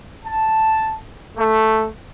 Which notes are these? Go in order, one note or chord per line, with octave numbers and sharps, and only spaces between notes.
A5
A3